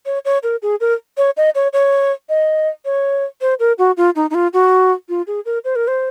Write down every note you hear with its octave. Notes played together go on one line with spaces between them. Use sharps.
C#5
C#5
A#4
G#4
A#4
C#5
D#5
C#5
C#5
D#5
C#5
C5
A#4
F#4
F4
D#4
D#4
F4
F#4
F4
G#4
A#4
C5
A#4
C5